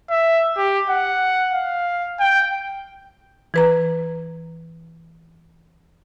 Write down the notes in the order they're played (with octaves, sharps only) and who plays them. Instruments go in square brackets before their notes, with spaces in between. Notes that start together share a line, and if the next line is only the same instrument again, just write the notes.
[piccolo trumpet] E5
G4
F#5
F5
G5
[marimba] E3 B4 A#5